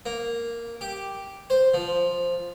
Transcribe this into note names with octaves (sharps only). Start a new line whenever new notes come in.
A#3
G4
C5
F3